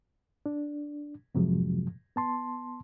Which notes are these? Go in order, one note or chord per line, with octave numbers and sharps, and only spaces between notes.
D4
F2 G#2 C3 F3 F#3 G#3
B3 A5 C6